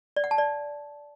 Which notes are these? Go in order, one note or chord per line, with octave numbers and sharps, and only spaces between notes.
D5
F#5
A5
D5